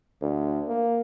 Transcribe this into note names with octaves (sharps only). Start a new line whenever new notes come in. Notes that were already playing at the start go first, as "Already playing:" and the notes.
D2
A#3